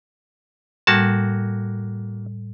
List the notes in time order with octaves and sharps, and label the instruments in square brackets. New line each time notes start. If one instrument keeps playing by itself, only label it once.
[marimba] A2 G3 [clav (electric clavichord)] A#3 F#4 A5